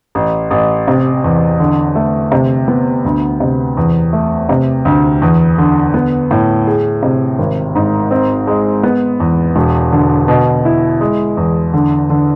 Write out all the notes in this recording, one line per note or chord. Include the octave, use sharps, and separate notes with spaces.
A1
A1
C3
E2
D3
A3
C3
B3
D2
C3
E2
A3
C3
D2
E2
D3
B3
A2
G#4
C3
G#1
G#2
C4
G#3
B3
E2
E1
D3
B2
E4
G#3
E2
D3
D3